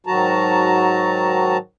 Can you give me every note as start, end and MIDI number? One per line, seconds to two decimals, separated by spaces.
0.06 1.57 44
0.06 1.57 51
0.06 1.57 54
0.06 1.57 66
0.06 1.57 81
0.06 1.57 82